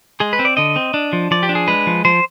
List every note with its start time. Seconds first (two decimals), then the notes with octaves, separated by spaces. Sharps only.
0.20 G#3 G#4
0.33 B4
0.39 C4
0.45 D5
0.57 D3 D#5
0.76 C4
0.94 D4
1.13 F3
1.31 F3 D5
1.43 G4
1.49 D4
1.55 G#4
1.68 G#3 B4
1.87 F3
2.05 F3 C5